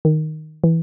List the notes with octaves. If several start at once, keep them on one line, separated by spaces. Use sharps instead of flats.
D#3
E3